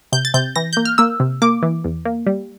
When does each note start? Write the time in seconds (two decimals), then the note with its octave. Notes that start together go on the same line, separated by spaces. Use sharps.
0.12 C3 G6
0.25 A6
0.34 C3 G6
0.56 E3 A#6
0.73 A#3 G6
0.85 F6
0.98 A#3 E6
1.20 C3
1.42 A#3 D6
1.63 E3
1.84 E2
2.05 A#3
2.27 G3